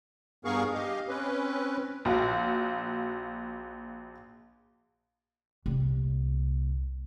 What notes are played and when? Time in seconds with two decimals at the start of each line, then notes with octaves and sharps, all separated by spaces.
0.45 G2 B3 G#4 A#4 F5 C#6
0.74 G4 D#5 F5
1.08 C4 C#4 B4
2.05 A#1 F#4 F5
5.66 C2 A#2